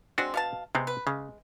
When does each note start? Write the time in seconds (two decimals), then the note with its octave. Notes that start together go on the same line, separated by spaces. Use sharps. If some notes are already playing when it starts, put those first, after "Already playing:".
0.18 G#3 C4 D4 F#4
0.34 B2 F5 A5
0.75 C3 G#3 B3 C4
0.87 B4
1.07 C#3 G#3